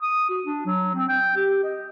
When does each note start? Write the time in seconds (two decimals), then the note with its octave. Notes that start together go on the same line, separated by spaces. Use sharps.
0.02 D#6
0.29 F#4
0.46 D4
0.66 F#3
0.95 C4
1.08 G5
1.36 G4
1.64 D#5